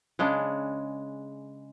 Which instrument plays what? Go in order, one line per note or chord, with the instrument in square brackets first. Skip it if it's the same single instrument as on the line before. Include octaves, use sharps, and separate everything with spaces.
[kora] C#3 G#3 D4